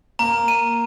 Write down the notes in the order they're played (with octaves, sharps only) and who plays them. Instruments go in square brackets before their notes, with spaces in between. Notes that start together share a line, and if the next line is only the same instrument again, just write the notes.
[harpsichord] A#3 [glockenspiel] A#5
[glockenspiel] D#7